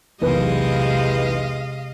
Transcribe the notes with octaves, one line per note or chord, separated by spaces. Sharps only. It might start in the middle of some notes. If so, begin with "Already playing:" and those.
B1 E2 C3 G#3 B4 D#5 F5